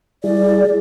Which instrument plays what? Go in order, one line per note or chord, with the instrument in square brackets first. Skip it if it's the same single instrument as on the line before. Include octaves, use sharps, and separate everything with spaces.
[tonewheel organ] G3 E4 G#4 [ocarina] D5